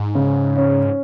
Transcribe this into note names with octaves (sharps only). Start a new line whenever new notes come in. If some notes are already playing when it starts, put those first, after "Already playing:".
Already playing: G#2
C#3
C#4